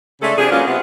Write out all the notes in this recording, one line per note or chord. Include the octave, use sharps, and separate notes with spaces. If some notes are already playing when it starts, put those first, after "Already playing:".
C#3 G#3 A3 D4 G#4 A4
C3 F3 D4 G4 G#4
F#3 G#3 A#3 B3 C#4 F4
C3 B3